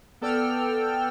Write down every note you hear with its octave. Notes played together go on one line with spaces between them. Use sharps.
B3 A4 D5 G5 E6 F6